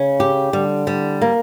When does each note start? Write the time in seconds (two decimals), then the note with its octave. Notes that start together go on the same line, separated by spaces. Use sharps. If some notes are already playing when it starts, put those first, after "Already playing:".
Already playing: C#3 C#4
0.20 G4
0.53 D3 G3
0.87 G3
1.21 A#3